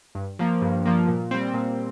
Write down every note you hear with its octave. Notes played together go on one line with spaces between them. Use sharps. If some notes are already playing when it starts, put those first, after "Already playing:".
G2
F3 A#3
G2
F3 A#3
A#2
G3 C4
A#2